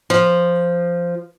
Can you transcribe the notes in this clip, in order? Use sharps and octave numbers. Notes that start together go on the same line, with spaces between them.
F3